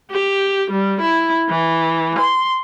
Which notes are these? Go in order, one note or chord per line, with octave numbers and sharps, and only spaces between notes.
G4
G3
E4
E3
C6